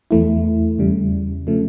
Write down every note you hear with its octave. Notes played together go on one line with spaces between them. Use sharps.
E2 E3 A3 E4
E2 C#3 G3
C#3 F3 A3